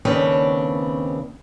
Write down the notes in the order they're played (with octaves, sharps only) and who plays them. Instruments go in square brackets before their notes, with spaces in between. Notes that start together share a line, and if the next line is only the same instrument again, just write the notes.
[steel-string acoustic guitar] D#2 C#3 C4 D4 B4 C#5